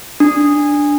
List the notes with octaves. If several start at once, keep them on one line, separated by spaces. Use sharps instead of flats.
D4